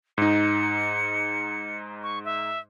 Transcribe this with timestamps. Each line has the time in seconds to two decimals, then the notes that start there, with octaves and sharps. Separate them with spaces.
0.18 G#2 D#4 C#7
2.03 C#6
2.25 E5